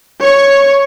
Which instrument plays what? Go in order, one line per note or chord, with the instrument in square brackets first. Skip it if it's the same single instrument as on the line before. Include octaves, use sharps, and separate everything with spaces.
[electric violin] C#5 C#6